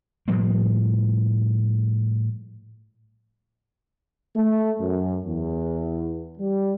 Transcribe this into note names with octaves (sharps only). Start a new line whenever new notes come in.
A2 F3 G3 A#3
A3
F#2
E2
G3